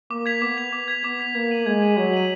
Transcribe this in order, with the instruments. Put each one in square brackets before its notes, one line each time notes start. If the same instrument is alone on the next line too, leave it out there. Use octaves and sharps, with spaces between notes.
[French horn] A#3 [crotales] D6
[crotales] G#6 B6 F7
[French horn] B3 [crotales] D6
[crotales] G#6 B6 F7
D6
G#6 B6 F7
[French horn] B3 [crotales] D6
[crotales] G#6 B6 F7
[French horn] A#3 [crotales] G#6
[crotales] D#7 F#7
[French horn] G#3 [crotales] G#6
[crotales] D#7 F#7
[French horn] F#3 [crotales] G#6
[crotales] D#7 F#7